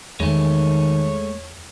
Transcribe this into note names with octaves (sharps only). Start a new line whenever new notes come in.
E2 D#3 G#3 A3 C#5